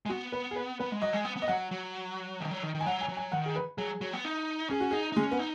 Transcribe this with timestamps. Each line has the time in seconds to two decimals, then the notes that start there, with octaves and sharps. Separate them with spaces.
0.06 G#3
0.09 B3 F#4
0.32 B4
0.51 G#4
0.56 B4
0.79 B3 B4
0.92 G#3
1.02 F#3 D#5
1.13 G#3
1.25 B3
1.36 B3
1.42 D#5
1.48 F#3 F#5
1.71 F#3
2.40 D#3
2.51 F#3
2.63 D#3
2.75 D#3
2.81 G#5
2.86 F#3 F#5
3.01 G#5
3.09 F#3
3.17 G#5
3.32 D#3 F#5
3.46 G#4
3.56 B4
3.78 F#3 G#4
4.01 F#3
4.13 B3
4.25 D#4
4.70 C#4 G#4
4.80 F#4
4.91 D#4 G#4
5.12 D#4
5.16 G#3 C#4
5.31 B3
5.39 D#4